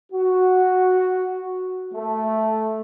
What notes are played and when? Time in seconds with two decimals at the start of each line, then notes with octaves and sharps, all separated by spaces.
0.13 F#4
1.94 A3